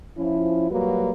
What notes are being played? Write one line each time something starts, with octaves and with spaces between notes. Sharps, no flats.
F3 C#4 E4
A#2 F#3 G3 A#3 F#4 B4